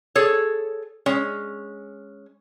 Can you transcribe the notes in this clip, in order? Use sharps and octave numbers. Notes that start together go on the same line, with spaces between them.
G#4 A4 C#5
G#3 C#4